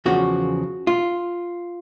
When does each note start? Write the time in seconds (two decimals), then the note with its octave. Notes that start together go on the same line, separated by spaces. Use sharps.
0.06 E2 C#3 F3 F#4
0.87 F4